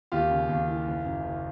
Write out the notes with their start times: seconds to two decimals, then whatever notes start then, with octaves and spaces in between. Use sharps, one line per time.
0.12 D#2 F4 G4
0.31 C#3
0.49 D#2
0.67 E3
0.86 F#1
1.05 F#2
1.23 F#1